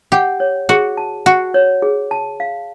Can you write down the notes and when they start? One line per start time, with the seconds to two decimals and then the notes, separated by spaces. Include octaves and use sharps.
0.12 G4 F#5
0.40 C#5
0.69 F#4 G#4
0.97 A5
1.26 F#4 F#5
1.54 C#5
1.82 G#4
2.11 A5
2.40 F5